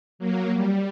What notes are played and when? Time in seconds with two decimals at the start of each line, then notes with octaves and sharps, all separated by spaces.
0.19 F#3 A#3
0.54 G3